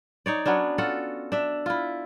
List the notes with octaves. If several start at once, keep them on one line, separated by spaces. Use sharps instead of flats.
D#4 C#5 D5
F#3 B3 C#4 D4
F4 F#4 A4 F#5
D4 E5
E4 F4